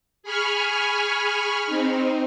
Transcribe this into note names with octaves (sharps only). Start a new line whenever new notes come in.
G#4 G#5 B5 C#6 F6
C4 D#4